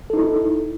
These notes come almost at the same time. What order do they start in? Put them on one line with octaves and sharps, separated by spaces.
A4 D#4 E4